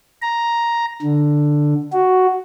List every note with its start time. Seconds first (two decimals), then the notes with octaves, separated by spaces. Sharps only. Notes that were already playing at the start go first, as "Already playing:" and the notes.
0.22 A#5
1.02 D3
1.93 F#4